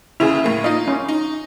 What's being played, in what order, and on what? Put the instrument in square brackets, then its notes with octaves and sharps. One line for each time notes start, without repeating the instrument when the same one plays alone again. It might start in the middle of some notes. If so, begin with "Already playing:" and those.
[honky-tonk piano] D#2 C#3 F7 [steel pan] E4 G#4
[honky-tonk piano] A2 A#3
[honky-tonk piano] D#4 F4 [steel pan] D#5
[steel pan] C#4
[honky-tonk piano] D#4